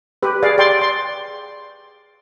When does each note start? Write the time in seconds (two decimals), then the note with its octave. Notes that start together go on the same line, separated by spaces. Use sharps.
0.23 G4 B4
0.43 G#4 D5 F5
0.58 D5 G5 C6
0.82 C6